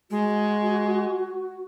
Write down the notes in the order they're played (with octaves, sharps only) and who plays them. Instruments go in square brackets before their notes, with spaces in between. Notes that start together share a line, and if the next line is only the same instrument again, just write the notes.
[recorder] G#3 [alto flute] F#4